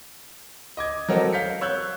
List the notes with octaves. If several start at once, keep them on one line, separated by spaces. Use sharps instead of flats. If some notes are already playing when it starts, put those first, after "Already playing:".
D#5 D6 G#6
F#3 C4 A4 A#4 D#5
F5 G6 B6 C#7
C#5 E6 F#6 G6